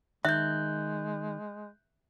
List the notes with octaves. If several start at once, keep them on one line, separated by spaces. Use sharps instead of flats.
D#3 G#3 E5 F#6 G6